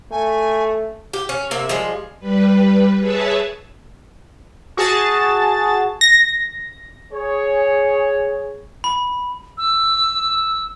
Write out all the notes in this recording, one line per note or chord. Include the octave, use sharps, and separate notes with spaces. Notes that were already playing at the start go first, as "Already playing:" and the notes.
A3 G#5
G4
C#4
C3 A#3 E5
F3 G3 G#3
G3 B4
G#4 B4 C#5 E5 A5
F#4 G#4 A5 A6
A#6
G#4 C#5
B5
E6